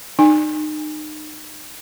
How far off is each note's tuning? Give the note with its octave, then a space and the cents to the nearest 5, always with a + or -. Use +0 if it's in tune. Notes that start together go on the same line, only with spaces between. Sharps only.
D#4 -30 G#5 -20